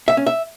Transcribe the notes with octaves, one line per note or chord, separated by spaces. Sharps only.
E5
C#4
E5